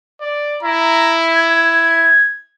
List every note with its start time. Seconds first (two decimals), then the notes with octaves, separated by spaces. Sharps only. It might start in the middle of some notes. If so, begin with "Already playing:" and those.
0.21 D5
0.63 E4 A#5
1.34 G#6